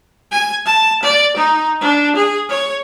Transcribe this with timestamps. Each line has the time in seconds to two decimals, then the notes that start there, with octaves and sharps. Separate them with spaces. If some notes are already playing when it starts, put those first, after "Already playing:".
0.31 G#5
0.66 A5
1.03 D5
1.36 D#4
1.81 D4
2.15 G#4
2.49 C#5